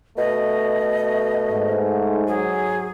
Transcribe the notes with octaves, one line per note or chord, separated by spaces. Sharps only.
B2 A3 D#5
G#2
F#3 G#4